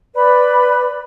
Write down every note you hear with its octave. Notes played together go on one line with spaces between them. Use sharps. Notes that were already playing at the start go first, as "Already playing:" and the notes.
B4 D5 B5